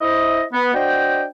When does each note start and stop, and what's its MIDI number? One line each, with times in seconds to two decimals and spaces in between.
0.01 0.43 64
0.01 0.43 72
0.01 0.43 75
0.52 0.72 59
0.74 1.24 62
0.74 1.24 66
0.74 1.24 72
0.74 1.24 75
0.74 1.24 79